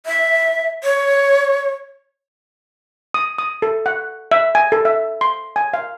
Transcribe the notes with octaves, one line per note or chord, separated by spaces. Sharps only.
E5
C#5
D#6
D#6
A4
F#5
E5
G#5
A4
E5
C6
G#5
F5